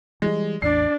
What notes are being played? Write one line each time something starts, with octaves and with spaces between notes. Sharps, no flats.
E3 G3 G#3
A1 E2 D4 D5 C7